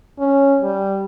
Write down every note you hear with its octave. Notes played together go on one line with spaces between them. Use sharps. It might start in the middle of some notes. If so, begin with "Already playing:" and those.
C#4
G3